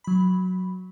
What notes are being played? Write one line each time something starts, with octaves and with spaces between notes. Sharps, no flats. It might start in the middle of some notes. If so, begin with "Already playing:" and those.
F#3 B5